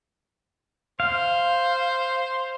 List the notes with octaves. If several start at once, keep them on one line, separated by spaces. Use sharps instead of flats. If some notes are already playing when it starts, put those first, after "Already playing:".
C5 F5